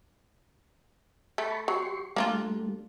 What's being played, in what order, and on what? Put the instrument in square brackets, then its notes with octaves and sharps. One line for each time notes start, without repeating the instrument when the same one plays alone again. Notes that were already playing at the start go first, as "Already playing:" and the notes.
[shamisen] A3 [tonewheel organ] A5 B5 C#6
[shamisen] F#3 [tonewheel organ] G4 C6 C#6
[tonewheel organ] G3 A3 [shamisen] A#3 D4 F4